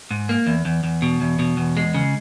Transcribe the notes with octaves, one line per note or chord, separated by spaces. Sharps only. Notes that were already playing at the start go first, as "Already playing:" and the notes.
G#2
A#3
E2
E2
E2
B2
E2
B2
E2
G#3
C#3